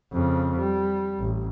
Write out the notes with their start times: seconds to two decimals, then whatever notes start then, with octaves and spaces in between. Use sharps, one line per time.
0.12 F2 C#3
0.58 G3
1.19 A1